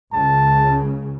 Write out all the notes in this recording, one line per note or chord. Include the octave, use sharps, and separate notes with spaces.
C#2 C#3 A5